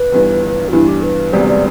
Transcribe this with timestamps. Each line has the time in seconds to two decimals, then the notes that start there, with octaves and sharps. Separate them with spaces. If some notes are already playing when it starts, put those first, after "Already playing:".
Already playing: B4
0.12 G1 G2 E3 B3 D4
0.68 F#4
0.72 G2 E3 B3 D4 E4
0.87 G4
1.02 B4
1.32 E1 D2 C3 G3 B3 D5
1.47 D5